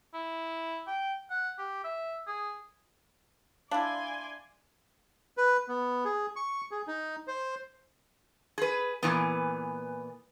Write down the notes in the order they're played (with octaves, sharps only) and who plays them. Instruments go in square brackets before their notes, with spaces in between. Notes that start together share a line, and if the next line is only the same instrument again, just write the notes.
[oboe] E4
G5
F#5
G4
E5
G#4
[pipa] D4 E4 [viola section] D5 G#5 C6 [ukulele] F5
[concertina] B4
B3
G#4
C#6
G#4
D#4
C5
[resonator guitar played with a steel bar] G#4 B4
A#2 E3 B3